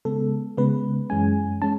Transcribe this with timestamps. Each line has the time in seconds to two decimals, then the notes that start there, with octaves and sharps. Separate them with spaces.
0.05 C#3 G#3 B3 A4
0.57 C#3 G#3 B3 B4
1.10 F#2 E3 G#3 C#4 G#5
1.62 G#3 C#4 A5